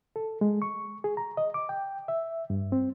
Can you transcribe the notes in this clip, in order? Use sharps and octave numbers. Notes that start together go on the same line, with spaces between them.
A4
G#3
C#6
G#4
A#5
D#5
D6
G5
E5
G2
C4